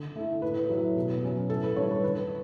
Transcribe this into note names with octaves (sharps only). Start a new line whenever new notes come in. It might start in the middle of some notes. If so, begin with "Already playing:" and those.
Already playing: D3
A3 E4
A2 B4
F#3 A3 E4
B2
F#3 C#4
A2 A4
B4
G3 D4 C#5
B4
D3 B4